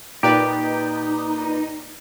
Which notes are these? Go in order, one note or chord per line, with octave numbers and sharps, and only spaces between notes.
A#2 D#4 G4 B4 D5